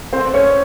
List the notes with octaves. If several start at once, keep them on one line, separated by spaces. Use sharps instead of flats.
C4 C5
C#4 C#5